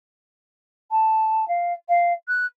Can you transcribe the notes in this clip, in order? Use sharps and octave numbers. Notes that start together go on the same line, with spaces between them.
A5
F5
F5
F#6